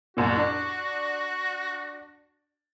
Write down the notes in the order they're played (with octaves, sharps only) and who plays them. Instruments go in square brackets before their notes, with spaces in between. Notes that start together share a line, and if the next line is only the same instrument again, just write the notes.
[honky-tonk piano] C2 F#2 A#2 [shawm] F#4
[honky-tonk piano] D4 D5